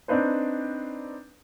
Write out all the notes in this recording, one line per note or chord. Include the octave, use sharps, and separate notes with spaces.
C4 D4 D#4 B4 C5